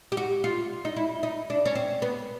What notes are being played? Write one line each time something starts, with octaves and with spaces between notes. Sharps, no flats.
G4
F#4
F4
D#4
E4
D#4
D4
C#4
C4
B3